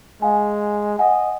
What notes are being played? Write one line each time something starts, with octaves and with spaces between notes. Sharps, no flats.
G#3 F5 G#5
D#5 F#5 G#5